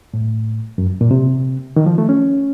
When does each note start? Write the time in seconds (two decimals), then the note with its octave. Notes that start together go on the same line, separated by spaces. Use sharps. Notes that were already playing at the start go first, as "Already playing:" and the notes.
0.14 A2
0.78 F#2
1.01 A#2
1.11 C3
1.76 D#3
1.86 F3
1.98 A3
2.09 C#4